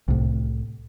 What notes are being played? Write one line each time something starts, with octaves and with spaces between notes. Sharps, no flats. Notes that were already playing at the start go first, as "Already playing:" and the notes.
C2 A2